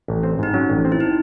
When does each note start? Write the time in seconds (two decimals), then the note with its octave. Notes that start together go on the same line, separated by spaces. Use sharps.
0.08 A1
0.23 C4
0.39 G#2 D#4
0.54 F#3 C#4
0.70 A1
0.85 C4
0.92 E4
1.00 D#4